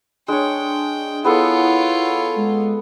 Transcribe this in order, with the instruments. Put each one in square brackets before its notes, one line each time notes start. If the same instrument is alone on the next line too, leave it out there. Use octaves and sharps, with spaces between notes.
[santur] G#3 C#5 [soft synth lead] D4 [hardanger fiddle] G5
[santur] B3 G#4 A4 [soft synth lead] E4 [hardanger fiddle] F4 C#5
[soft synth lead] G#3